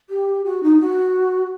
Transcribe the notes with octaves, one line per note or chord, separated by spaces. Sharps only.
G4
F#4
D#4
F#4